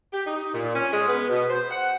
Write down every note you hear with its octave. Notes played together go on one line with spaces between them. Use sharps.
G4
D#4
A#2
C#4
G#3
B3
B2
C5
F#5